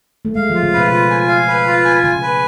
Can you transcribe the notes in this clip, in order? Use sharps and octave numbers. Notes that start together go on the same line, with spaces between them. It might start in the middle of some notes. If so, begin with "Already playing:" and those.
A3
G#3 F5
F3
F4
C#3
B2 B4
F4
G#5
F5
B4
F4
G#5
C#3 G#5
B4